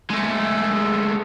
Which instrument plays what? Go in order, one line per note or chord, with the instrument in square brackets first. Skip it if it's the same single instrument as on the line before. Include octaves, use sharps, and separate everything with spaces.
[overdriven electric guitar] G#3 A3